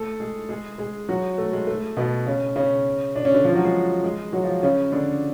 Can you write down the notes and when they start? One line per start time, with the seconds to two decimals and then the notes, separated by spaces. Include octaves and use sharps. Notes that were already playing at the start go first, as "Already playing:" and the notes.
Already playing: A3 A4
0.20 G#3 G#4
0.49 G#3 G#4
0.78 G#3 G#4
1.09 F#3 F#4
1.38 A3
1.53 G#3
1.67 A3
1.97 B2 B3
2.26 C#3 C#4
2.56 C#3 C#4
3.16 D4
3.25 C#4
3.34 D3 D4
3.45 F3 F4
3.54 F#3 F#4
3.64 G#3 G#4
4.04 G#3 G#4
4.33 F#3 F#4
4.44 F3 F4
4.63 C#3 C#4
4.92 D3 D4